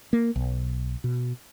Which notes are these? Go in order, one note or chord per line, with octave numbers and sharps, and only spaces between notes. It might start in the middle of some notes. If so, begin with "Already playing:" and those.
A#3
B1
B2